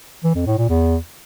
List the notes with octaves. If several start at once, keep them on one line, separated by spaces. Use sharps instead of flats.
E3
F2
A2
A#2
E2